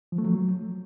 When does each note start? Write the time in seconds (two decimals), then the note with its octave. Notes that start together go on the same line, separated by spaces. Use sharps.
0.12 F3
0.18 A3
0.24 F#3